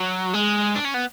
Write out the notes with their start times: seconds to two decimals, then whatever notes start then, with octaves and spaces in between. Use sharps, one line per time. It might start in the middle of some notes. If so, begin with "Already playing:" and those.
Already playing: F#3
0.34 G#3
0.76 D4
0.85 C#4
0.94 B3